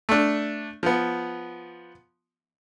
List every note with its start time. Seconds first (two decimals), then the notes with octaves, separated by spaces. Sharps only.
0.09 A3 D4
0.83 F3 B3